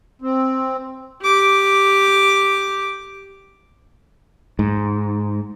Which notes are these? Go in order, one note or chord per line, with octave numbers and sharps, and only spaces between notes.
C4
G4 D6
G#2